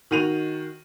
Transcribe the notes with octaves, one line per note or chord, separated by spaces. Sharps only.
D#3 F#4 D#7 F7